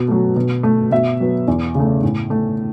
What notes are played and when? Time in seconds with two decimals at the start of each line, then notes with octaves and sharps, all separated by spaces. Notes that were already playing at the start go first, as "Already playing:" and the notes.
Already playing: B2
0.08 F#3 A3
0.36 B2
0.63 A3
0.91 B2 E5
1.20 F#3 B3
1.48 E2
1.75 C#3 A3
2.03 A2
2.30 A3